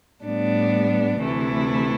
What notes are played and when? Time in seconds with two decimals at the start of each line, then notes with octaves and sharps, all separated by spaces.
0.23 A2 G3 B3 D4
1.21 D2 C3 E3 A3 E4